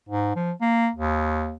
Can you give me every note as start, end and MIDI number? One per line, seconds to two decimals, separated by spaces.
0.09 0.31 44
0.36 0.52 53
0.61 0.89 58
0.96 1.55 39